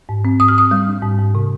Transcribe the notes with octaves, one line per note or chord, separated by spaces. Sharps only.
G#2
C4
G#2 D#6
F6
G#2 D#6
G3
D4
G#2
G#2
C3